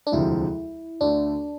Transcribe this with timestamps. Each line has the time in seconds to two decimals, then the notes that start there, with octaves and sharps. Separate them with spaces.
0.07 D4
0.12 E1 D2 C3 F3 E4
1.01 D2 D3 A3 D4